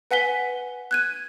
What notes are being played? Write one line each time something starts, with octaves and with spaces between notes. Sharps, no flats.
B4 F#5 G#5 B6 G7
F#6 G#6 D#7